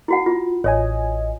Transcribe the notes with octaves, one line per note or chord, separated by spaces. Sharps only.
E4 F#4 F#5
F4
A1 C#5 D#5 G#5